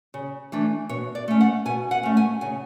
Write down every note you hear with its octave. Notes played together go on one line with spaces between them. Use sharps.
C#3
E3 A3 D4
B2 C#5
D5
A3 C#4
F#5
B2 G#5
F#5
A3 C#4
G#5
C#3 G#5